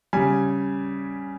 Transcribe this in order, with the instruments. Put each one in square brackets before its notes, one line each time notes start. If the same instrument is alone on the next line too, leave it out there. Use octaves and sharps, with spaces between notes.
[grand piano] C#3 G3 G#5